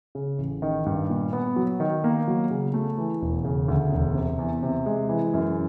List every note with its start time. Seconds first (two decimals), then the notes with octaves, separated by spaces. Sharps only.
0.15 C#3
0.38 A1
0.62 D#3
0.86 G2
1.10 A#2
1.33 B3
1.56 F#3
1.80 D#3
2.04 A#3
2.28 F#3
2.51 C#3
2.74 A3
2.98 E3
3.22 E1
3.44 C#3
3.68 D2
3.92 E1
4.15 C3
4.39 E2
4.63 C3
4.86 G#3
5.09 E3
5.34 F#2